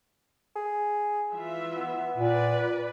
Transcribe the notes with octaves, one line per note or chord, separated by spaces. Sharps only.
G#4
E3 F4 E5
B3
A#2 B4 D5